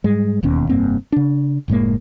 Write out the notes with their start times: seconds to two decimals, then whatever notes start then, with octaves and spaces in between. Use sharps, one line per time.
0.04 G#2 G3 G#3
0.43 E1 D#2 B2 C#4
0.69 F1 G2 A#3 C4
1.12 C#3 D4
1.68 F#1 A2 G#3 A#3